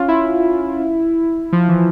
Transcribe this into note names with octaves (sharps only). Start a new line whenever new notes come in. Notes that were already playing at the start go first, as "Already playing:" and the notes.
Already playing: C#4 F4
E4
F3
E3